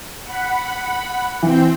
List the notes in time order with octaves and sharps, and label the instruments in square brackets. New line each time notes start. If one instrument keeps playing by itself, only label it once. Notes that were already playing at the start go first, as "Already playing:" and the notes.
[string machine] F#5 B5
[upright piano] E3 [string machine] C4 G5